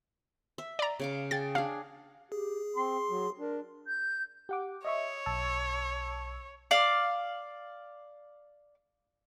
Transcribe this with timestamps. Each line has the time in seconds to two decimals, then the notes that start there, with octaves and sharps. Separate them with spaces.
0.58 E5
0.79 D5 A#5
1.00 C#3 F5 D6
1.31 G#4 G5 A6
1.55 D4 G#4 F5
2.32 G4 G#4
2.76 C4 C6
3.10 F#3
3.39 D4 A#4
3.87 G6
4.49 G4 F#5 D6
4.85 C#5 D#5 E5 C#6
5.26 B1 A5 E6
6.71 D5 F5